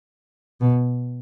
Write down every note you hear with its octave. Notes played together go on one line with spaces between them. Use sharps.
B2